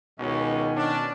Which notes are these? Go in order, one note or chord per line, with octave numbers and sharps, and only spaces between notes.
C#2 B2 D#3 C#4 D#5 G#5
C#4 D4